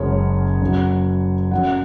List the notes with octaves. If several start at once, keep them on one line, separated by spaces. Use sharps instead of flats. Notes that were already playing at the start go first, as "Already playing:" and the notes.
Already playing: F#1 F#2 C#3 G#3 C#5
F#1 F#2 F#3
F#2 F#3 F#5